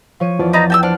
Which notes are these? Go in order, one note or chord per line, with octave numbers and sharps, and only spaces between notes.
F3 C#5 D#7
E2 F3 D5
D#4 B4 A#5 A6 A#6
G5 A5 E6
D4 C5 F#5 F6